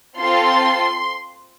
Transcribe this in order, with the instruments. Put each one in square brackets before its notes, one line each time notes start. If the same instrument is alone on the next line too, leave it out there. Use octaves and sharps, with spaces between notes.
[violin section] C4 F4 A4 C6